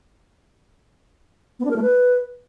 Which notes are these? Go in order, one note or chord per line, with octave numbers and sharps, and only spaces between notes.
B3
D4
A#4
A3
B4